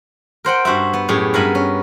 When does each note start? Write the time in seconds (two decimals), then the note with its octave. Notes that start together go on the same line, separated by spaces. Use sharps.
0.45 A#4 C5 F#5 G5
0.65 G2 F#4 C5 E5
0.93 B3
1.08 F#2 A2 G4 G#4
1.34 G2 B3 A#4 E5 G#5 B5
1.55 C#4